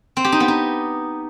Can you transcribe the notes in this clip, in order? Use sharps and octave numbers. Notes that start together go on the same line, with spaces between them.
C4
G4
D#4
B3
D#4